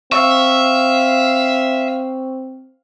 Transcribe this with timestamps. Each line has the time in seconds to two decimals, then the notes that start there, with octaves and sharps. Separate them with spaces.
0.12 C4 E5 F5 C#6 E6